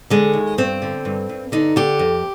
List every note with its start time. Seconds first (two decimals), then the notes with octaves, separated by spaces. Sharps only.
0.10 D3 G#3
0.34 D#2
0.58 G2 C4
0.82 D3
1.05 G2
1.29 G2
1.52 D3 D#4
1.76 D3 G4
1.99 F2